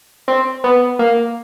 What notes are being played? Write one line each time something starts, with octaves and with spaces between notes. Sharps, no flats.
C4
B3
A#3